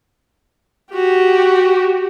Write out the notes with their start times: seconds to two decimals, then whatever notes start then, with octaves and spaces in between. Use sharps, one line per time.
0.92 F#4 G4